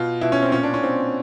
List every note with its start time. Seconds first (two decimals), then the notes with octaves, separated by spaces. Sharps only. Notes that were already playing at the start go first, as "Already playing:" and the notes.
Already playing: B2 F4
0.21 B2 E4
0.32 C#4
0.42 C4
0.52 A#2 C#4
0.63 D4
0.74 C#4
0.83 A#2 C4